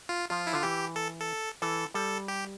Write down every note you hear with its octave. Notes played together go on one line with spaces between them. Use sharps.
F4
F3 F4
E4
D3 F4
E3 G4
A4
A4
E3 A4
G3 A4
G4